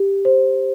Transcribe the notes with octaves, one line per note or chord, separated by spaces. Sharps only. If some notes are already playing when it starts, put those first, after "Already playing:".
Already playing: G4
C5